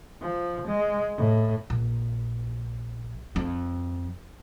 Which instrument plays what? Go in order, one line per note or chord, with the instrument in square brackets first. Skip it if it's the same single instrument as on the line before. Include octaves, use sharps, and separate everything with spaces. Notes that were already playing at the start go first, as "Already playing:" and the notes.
[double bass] F3
G#3
A2
[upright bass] A#1
F2